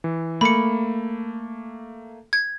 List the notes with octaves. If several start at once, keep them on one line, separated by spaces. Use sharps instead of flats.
E3
A3 A#3 B5 C#7
G#6